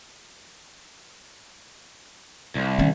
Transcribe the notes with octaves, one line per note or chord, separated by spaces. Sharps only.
C2
D#3 C#4